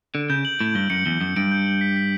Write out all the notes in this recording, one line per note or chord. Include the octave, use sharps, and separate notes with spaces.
D3 D7
C#3 G6
F#7
A2 D7
G2 G7
F#2 C#7
E2 G7
F#2 C#7
G2 D7
G6
F#7
B6
B6